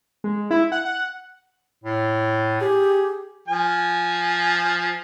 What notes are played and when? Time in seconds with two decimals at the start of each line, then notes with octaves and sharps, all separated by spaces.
0.24 G#3
0.51 E4
0.72 F#5
0.85 F#5
1.84 A2
2.60 G4 G#4
3.48 F3 G#5